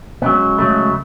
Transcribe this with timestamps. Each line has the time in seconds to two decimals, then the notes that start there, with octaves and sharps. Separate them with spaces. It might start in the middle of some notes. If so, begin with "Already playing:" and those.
0.22 C#2 C#3 F#3 B3
0.58 C#2 C#3 F#3 A3